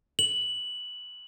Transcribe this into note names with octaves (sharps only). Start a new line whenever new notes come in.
F#7